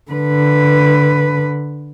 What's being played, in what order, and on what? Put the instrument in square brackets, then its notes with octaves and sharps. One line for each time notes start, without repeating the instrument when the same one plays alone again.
[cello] D3 B4